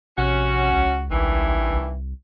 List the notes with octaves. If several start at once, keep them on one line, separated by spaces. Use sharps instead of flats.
A#1 C3 C#4 F#4
C#2
A1 G2 D#3 E3
C2